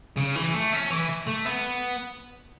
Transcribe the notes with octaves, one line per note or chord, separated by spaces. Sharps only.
C#3
E3
A3
C#4
E3
A3
B3